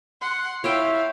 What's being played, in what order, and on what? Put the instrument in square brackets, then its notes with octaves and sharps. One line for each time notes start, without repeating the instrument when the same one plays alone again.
[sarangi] F#5 [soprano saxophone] C6
[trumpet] E4 [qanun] C#5 E5 G5 [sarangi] F5